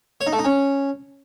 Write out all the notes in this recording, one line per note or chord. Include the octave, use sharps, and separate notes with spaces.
C#5
D#4
A3
D#4
C#4